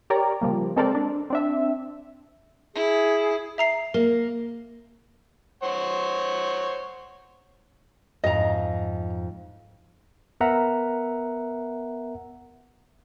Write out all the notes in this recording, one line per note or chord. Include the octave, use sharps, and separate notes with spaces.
G4 A#4 C#5 D5 A#5
C#3 F3 G3 A#3
G#3 C4 A4 A#4 C5 D5
D4
C4 D4 E5
E4 G#4
E5 A#5 C7
A#3 A#4
C5 C#5 F#5
F2 G#2 D#5 A#5
B3 A#4 E5 F#5 A#5